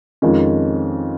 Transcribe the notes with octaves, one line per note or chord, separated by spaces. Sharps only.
F2 D#3 G#3 C#4